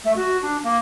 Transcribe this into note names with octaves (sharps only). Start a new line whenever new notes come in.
A3
F#4
D4
A#3